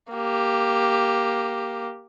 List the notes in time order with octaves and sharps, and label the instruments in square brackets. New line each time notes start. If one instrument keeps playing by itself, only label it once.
[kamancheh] A#3 G4